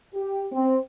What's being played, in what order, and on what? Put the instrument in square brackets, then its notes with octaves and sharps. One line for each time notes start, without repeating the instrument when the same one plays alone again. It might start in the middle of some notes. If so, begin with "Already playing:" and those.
[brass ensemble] G4
C4